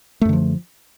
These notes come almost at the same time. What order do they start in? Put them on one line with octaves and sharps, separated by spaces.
A3 F#2 D3 F3